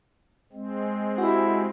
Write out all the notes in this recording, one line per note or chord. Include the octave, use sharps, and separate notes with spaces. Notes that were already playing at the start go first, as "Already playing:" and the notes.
G#3 C4
E4 F#4 G4